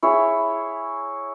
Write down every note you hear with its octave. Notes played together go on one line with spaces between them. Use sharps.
E4 G#4 C#5